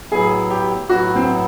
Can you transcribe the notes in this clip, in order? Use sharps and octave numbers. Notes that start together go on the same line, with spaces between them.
A2 F#3 B3 E4 G#4
G4
A2 F#3 B3 E4 F#4
C4